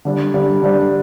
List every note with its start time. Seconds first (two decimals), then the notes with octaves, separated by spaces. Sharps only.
0.05 D3 G3 D4
0.34 D3 G3 D4
0.62 D3 G3 D4